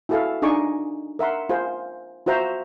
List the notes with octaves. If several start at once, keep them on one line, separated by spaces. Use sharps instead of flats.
E4 F#4 G#4 A4 E5 F5
D4 D#4 G#4 G#5 C#6 D6
A#4 E5 F#5 C6
F4 G#4 C5
F4 F#4 C5 E5 A#5